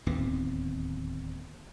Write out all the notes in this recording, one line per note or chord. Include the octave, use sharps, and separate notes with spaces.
D1 D#2 B3 C4